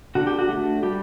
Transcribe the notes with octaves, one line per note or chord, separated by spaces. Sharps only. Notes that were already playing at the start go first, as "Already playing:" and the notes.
D3 F#4
G4
F#4
A3 D4
G3 G4